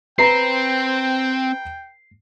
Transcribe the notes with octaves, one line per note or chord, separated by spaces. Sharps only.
C4 B4 G5 A#5 C7